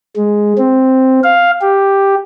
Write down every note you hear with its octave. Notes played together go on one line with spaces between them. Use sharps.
G#3
C4
F5
G4